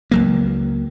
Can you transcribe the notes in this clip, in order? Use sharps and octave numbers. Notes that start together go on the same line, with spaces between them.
C#2 F#3 A#3